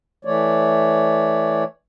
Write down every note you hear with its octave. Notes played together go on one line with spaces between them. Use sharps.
E3 A3 C#5 D5